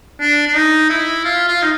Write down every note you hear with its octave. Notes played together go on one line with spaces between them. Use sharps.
D4
D4
D#4
E4
F4
F4
D#4